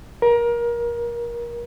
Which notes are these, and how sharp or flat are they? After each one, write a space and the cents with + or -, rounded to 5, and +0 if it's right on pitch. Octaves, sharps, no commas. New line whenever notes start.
A#4 +25